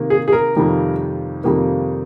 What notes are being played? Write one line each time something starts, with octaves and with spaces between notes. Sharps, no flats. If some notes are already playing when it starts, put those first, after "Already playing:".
Already playing: C3 D#3 A#3
G#4
G#4
A#4
F2 C3 D#3 G3 A#3
F2 C3 D#3 G3 A#3